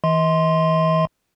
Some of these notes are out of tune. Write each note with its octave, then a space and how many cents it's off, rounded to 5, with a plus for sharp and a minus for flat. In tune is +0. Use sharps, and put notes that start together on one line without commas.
E3 -25 D#5 +40 C6 +0